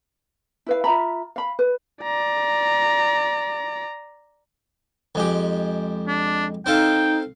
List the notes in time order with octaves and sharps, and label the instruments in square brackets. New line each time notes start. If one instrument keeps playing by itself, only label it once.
[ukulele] E4 B4 F5
F4 E5 A#5 B5
F5 B5
B4
[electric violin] D5 A#5
[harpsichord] F2 G#3 G4
[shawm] D4
[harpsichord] C4 A4 F5 [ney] D#4 [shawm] G5